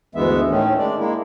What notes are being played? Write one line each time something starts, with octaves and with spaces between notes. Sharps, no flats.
D2 G2 E3 G#3 B3 E5
A2 D#3 A3 C#4
G#3 D4 D5
G#3 A#3 E4